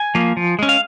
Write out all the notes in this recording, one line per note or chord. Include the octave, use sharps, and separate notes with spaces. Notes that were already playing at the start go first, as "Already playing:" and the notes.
Already playing: G#5
F3 A#3
F3
G#3 C#4
F5